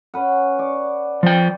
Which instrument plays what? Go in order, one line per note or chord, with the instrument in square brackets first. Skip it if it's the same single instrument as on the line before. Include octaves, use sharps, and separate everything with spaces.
[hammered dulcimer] C#4 B4 F#5
D5 C#6
[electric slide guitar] F3 G5